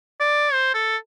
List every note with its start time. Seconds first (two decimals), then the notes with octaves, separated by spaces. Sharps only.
0.20 D5
0.53 C5
0.74 A4